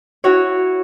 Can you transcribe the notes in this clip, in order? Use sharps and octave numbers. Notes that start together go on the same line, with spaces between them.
E4 F#4 C#5